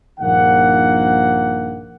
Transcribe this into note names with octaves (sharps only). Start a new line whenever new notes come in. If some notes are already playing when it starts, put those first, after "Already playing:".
A#1 G2 D#3 F3 A#3 F#5